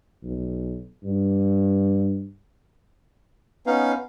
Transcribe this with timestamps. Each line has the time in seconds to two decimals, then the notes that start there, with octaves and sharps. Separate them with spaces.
0.23 B1
1.04 G2
3.66 B3 C#4 D#4 F5